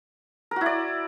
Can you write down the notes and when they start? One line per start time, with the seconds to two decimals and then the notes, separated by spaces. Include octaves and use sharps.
0.51 A#4
0.56 F#4
0.61 E4
0.66 D5